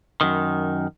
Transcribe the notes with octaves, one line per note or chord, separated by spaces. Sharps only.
F#2 D#3